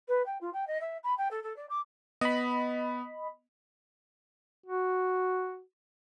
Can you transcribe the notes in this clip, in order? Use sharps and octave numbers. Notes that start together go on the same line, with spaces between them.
B4
G5
F4
G5
D#5
E5
B5
G5
A4
A4
D5
D6
B3 D#5 B5
F#4